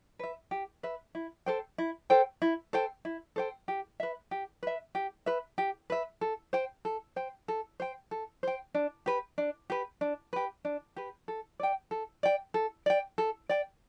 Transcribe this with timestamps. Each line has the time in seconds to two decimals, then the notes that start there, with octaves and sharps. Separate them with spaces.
0.19 B4 E5
0.51 G4
0.83 B4 E5
1.15 E4
1.46 A4 C5 G5
1.78 E4
2.10 A4 C5 G5
2.42 E4
2.73 A4 C5 G5
3.05 E4
3.36 A4 C5 G5
3.68 G4
4.00 B4 E5
4.31 G4
4.63 B4 E5
4.95 G4
5.26 B4 E5
5.58 G4
5.90 B4 E5
6.21 A4
6.53 C5 G5
6.85 A4
7.16 C5 G5
7.48 A4
7.80 C5 G5
8.11 A4
8.43 C5 G5
8.75 D4
9.06 G4 B4
9.38 D4
9.70 G4 B4
10.01 D4
10.33 G4 B4
10.65 D4
10.96 G4 B4
11.28 A4
11.60 D5 G5
11.91 A4
12.23 D5 G5
12.54 A4
12.86 D5 G5
13.18 A4
13.49 D5 G5